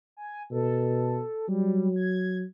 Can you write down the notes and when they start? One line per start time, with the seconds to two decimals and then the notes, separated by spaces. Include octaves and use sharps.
0.17 G#5
0.51 B2 A4
1.49 F#3 G3
1.96 G#6